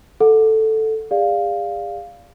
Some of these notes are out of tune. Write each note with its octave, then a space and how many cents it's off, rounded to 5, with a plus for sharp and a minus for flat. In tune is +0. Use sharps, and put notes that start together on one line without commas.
A4 +0 F#5 -20
G#4 -40 D5 +0 F5 +0